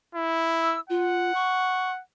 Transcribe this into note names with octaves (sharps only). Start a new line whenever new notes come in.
E4
E6
F4 F#5
C#6